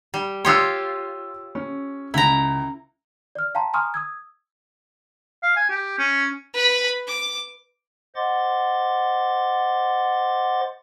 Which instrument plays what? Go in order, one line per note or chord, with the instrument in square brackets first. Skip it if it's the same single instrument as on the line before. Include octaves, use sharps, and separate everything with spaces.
[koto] G3
[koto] F4 G4 C#5 [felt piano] C6 D#6 E6
[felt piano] C#4
[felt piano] C#2 [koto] E4 A#5
[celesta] D5 F6
F5 G5 A5 A#5 C6
G#5 A#5 C6 C#6 D#6 F6
D#6 E6 G#6
[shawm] F5
G#5
G4
C#4
[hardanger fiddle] B4 B5
D6
[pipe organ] C5 D#5 F#5 C6 D6 A6